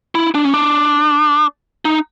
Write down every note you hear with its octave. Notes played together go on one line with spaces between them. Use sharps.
E4
D4
C#4
D4
D#4